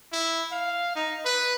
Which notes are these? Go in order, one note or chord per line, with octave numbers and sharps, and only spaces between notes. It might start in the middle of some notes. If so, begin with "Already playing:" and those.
E4
F5
D#4
B4